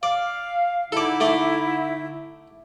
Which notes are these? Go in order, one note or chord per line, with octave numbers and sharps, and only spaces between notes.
D5 F5
D3 D#4 E4 A4 D5
A3 D5